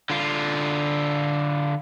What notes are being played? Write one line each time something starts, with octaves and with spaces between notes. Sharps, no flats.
D3 F4